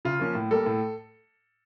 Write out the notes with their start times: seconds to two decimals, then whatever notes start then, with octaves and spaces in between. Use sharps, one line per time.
0.05 C#3 F4
0.20 F3 A#3 C#4
0.35 A2
0.51 G3 A#3 A4
0.66 A2